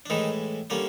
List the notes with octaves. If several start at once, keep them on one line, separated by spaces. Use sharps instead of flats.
D4
A2 D#3 E3 G#3 D#4
D3 G3 A#3 C#4 D4